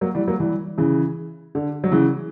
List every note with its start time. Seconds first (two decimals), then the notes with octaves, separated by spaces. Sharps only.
0.01 F#3 A#3
0.15 E3 G3
0.28 F#3 A#3
0.40 E3 G3
0.78 C#3 E3
1.55 D3
1.84 F#3
1.92 C#3 E3